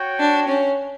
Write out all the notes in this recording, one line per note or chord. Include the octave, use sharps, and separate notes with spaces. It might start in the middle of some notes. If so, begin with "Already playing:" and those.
Already playing: F#4 C#5 G5
D4
C#4